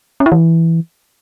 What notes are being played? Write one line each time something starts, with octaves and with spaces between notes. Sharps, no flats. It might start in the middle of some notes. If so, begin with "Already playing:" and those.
C#4
E4
E3